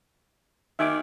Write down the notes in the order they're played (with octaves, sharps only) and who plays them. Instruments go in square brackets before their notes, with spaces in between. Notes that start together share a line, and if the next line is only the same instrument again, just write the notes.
[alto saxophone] D#3 [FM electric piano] E5 G#5 D6